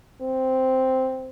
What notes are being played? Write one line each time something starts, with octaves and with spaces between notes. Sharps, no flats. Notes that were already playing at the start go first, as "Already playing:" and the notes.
C4